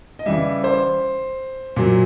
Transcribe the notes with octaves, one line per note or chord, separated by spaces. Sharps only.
D#5
C#3 E3 G3 E5
C5
A#2 F#3